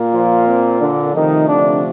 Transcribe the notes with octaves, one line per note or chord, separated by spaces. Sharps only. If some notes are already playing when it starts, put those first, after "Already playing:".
Already playing: A#2 A#3
F3 F4
C4
D3 D4
C3 D#3 F3 A3 D#4
D3 D4